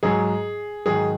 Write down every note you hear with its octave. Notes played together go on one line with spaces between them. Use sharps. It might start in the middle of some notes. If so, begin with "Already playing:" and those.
G#2 F#3 G#4
G#2 D#3 F#3 G#4